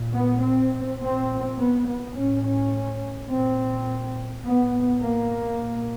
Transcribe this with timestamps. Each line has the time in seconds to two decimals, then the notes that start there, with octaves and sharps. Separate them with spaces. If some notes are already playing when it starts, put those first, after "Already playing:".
Already playing: A#2
0.14 B3
0.42 C4
1.00 A#2 C4
1.57 B3
1.86 B3
2.15 A2 C#4
2.43 C#4
3.29 A#2 C4
4.45 A2 B3
5.03 A#3
5.60 A#2